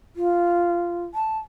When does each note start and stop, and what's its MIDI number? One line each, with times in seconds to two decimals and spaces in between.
0.16 1.05 65
1.14 1.38 81